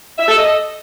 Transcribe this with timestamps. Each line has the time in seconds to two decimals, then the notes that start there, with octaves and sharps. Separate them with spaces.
0.18 E5
0.28 A4
0.38 D#5